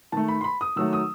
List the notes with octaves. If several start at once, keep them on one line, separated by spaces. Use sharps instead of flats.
D#3 A3 A5
B5
C6
B5
D#6
D#3 F#3 A3 E6
D#6